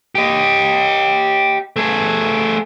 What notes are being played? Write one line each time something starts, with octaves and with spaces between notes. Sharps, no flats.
G4 D#5
A3 G#4